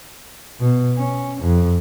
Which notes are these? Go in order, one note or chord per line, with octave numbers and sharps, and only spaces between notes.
B2
C#4
F2